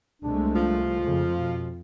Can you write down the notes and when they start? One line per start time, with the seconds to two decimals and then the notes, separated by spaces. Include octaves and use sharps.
0.22 C2 G#3 A3 D4
0.55 F3 F4
1.03 F2 C#3
1.37 B2